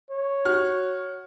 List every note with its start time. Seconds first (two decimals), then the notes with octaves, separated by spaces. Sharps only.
0.11 C#5
0.45 F#4 F6